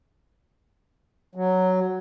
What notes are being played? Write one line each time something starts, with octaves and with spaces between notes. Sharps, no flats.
F#3